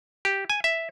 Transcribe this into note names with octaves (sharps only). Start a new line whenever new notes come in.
G4
G#5
E5